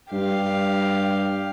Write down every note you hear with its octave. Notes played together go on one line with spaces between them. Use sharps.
G2 G4 F5